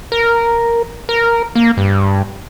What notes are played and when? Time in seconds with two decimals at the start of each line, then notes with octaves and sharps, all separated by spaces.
0.12 A#4
1.09 A#4
1.55 A#3
1.77 G2